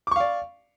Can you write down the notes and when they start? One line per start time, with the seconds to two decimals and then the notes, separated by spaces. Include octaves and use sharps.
0.07 D6
0.11 C#6
0.16 F5
0.20 D5